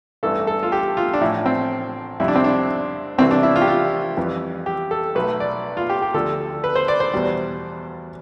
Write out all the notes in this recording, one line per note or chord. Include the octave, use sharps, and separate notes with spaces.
A1 G2 E3 A3 A4
A4
F4
G4
F4
D4
A1 A2 F3 E4
C4
F2 C3 G3 E4
D4
C4
D4
C2 C3 E3 G3 C4
D4
E4
F4
G4
F4
F2 E3 G3
G4
A4
B1 B2 A3 B4
D5
F4
G4
G4
D2 D3 F3 A4
B4
C5
D5
C5
E2 B2 G3